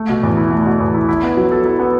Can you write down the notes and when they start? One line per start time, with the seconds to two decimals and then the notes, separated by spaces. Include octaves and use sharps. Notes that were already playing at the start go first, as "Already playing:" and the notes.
Already playing: A3
0.09 B2
0.23 E2
0.37 E4
0.51 A3
0.66 B2
0.80 E2
0.94 E4
1.09 E4
1.23 B3
1.37 F#3
1.51 A4
1.66 E4
1.79 B3